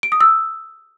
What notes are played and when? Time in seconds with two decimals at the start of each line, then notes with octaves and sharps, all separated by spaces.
0.03 D7
0.12 D#6
0.21 E6